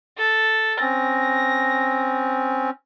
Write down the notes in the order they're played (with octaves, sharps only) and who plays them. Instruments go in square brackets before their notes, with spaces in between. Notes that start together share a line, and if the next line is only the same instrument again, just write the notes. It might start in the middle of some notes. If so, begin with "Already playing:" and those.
[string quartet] A4
[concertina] C4 C#4 [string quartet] A#6